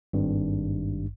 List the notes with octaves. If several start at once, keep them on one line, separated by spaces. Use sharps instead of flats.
G#1 G2